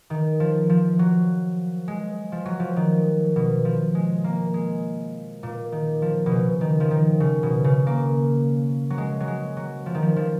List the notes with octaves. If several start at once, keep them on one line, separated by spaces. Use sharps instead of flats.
D#3
F3
F3
F#3
G#3
F3
F#3
F3
D#3
B2
F3
G#3
A#3
G#3
A#2
D#3
F3
B2
C#3
D#3
F3
D#3
C#3
B2
C#3
A#3
F#3
G#3
F#3
G#3
F#3
F3
D#3
F3
F3